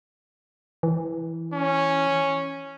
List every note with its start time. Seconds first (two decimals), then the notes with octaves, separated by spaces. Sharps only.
0.83 E3
1.54 C#4